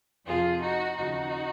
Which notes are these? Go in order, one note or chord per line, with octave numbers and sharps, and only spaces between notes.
F2 C3 F3 F4 G#4
D#4 F#4
D#2 C#3 F3 D#4 F#4